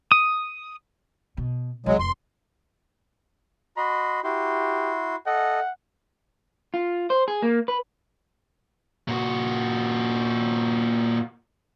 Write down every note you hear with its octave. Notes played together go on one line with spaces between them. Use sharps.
D#6
B2
C2 F#2 F#3 G#3
F1 C6
F#4 D#5 B5 C6
E4 F#4 G4 C6
A4 D#5 F#5
F4
C5
G#4
A#3
B4
A#2 F#4